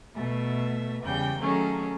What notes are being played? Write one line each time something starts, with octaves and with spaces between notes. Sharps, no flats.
B2 A3 E5
E2 C#3 G3 G5 G6
D#3 F#3 A3 C#4 G#4 A4